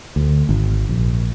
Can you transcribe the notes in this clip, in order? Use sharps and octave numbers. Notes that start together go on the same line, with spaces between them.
D2
G#1
A#1